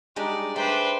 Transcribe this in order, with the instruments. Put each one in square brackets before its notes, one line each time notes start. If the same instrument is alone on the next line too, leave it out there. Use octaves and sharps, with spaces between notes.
[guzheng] G3 G#3 D4 [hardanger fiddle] D#4 D5
[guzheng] A3 [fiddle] D4 G5 [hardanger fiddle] B4 C5